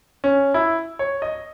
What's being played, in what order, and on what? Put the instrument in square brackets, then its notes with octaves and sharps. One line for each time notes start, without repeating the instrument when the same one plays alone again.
[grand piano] C#4
E4
C#5
D#5